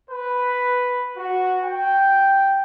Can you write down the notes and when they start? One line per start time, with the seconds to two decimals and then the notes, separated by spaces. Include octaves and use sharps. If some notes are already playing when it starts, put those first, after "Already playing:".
0.10 B4
1.17 F#4
1.64 G5